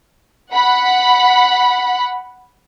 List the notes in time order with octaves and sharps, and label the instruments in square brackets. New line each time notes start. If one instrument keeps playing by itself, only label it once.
[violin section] F#5 B5